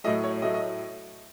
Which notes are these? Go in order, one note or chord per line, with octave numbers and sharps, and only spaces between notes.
A2 F#3 A3 D#5
C#5
A2 F#3 A3 D#5
D#5